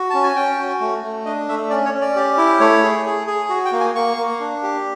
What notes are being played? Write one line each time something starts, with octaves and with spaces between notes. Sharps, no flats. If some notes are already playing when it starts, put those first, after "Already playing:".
Already playing: F#4
C#4 A5
G#5
C#4 G5
F#4
A3
A3
D4 D#5
A3 E5
C#4 D5
C#5
C#4
D5
G4
E4
A3 C#5
G#4
G#4
G#4
F#4
G5
A#3
G#5
A#3 C#6
A#3
D4
G4